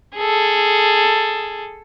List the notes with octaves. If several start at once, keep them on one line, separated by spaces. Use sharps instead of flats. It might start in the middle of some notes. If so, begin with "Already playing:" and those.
G#4 A4